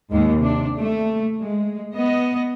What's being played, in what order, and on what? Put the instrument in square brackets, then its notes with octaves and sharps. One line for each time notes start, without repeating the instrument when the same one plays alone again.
[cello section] D#2 G#2 G#3
C3 D4
A3
G#3
B3 D#5